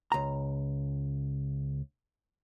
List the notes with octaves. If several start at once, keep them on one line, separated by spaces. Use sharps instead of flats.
C#2 A#5